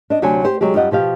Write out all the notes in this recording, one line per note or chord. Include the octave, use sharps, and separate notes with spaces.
D4 D#5
D2 C3 F#3 D4 G#5
G4 C5
C3 F#3 G#3 G4
F#2 G3 F4 G4 D#5 F#5
B2 F3 G4 F5